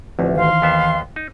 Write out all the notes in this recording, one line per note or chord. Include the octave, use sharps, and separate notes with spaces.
A1 D2 F3 C4 E5
D#3 E3 C5 F5 C6
D#2 B3 E5
D#4